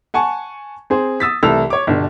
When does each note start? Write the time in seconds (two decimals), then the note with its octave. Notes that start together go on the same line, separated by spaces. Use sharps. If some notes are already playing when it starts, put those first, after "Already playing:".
0.14 F#5 G#5 A5 C#6
0.90 C4 G#4 C5
1.20 D#6 E6 A6 B6
1.43 C2 E3 A3 A5 E6 F7
1.70 C#5 D6
1.87 G1 B2 D4